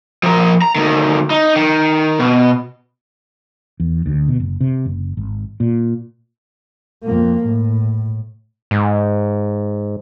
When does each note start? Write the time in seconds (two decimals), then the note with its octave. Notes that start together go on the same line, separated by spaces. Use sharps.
0.23 F3 A#4
0.62 A#5
0.76 D2 D#3
1.30 D#4
1.56 D#3
2.19 B2
3.80 E2
4.06 D2
4.28 B2
4.40 F#1
4.61 C3
4.86 F#1
5.17 G#1
5.60 A#2
7.04 F2 A#3
7.44 A2
8.71 G#2